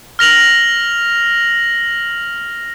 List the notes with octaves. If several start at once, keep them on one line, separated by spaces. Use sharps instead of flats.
F6 A#6 F7 F#7